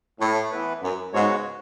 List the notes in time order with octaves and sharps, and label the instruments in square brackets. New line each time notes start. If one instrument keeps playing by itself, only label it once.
[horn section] A2
[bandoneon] E3 B3 E4 B4
[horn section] F#2
[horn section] G#2 [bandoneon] C#3 G#3 B3 F#4 C#5